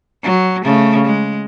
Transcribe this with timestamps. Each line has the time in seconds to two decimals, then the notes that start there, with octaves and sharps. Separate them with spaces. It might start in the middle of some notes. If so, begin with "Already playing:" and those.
0.23 F#3
0.63 C#3 A3
1.06 G#3